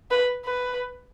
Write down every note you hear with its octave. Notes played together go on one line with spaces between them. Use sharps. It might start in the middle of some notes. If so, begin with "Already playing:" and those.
B4
B4